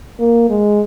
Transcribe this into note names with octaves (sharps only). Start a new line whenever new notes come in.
A#3
G#3